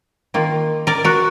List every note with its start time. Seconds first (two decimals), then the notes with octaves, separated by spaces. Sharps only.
0.34 D#3 A#3 F4
0.87 A#4 D5
1.04 F#4 A#4